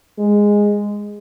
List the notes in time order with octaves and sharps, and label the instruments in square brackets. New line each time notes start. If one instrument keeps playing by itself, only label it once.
[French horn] G#3